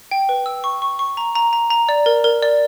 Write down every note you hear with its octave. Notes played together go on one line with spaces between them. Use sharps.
G5
B4
E6
C#6
C#6
C#6
A#5
A#5
A#5
A#5
D5
A#4
A#4
D5